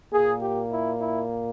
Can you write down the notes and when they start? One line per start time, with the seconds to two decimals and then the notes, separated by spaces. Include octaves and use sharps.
0.13 A#2 A#3 G#4
0.42 G4
0.72 E4
1.01 E4